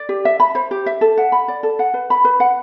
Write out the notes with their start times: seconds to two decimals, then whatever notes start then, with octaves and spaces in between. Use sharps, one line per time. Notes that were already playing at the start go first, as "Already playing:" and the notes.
Already playing: D5
0.09 G4
0.25 E5
0.40 B5
0.55 C5
0.71 G4
0.86 E5
1.01 A4
1.18 F#5
1.32 B5
1.48 D5
1.63 A4
1.79 F#5
1.94 B4
2.10 B5
2.25 B4
2.40 F#5